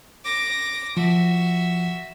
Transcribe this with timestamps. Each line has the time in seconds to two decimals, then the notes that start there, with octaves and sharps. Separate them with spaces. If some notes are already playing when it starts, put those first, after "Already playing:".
0.25 D6 A#6
0.97 F3 F#4 E5